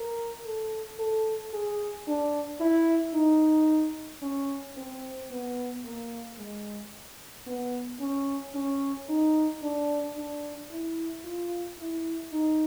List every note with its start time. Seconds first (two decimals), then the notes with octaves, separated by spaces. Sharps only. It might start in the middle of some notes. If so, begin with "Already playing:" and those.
Already playing: A#4
0.46 A4
0.99 A4
1.54 G#4
2.07 D4
2.61 E4
3.15 D#4
4.23 C#4
4.77 C4
5.31 B3
5.85 A#3
6.39 G#3
7.47 B3
8.00 C#4
8.55 C#4
9.09 D#4
9.63 D4
10.16 D4
10.71 E4
11.24 F4
11.79 E4
12.33 D#4